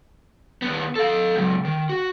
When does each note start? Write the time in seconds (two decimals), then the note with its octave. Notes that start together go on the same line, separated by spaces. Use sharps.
0.62 D#2 B3
0.96 A4 F5
1.36 C#2 F#3
1.65 D#3
1.89 F#4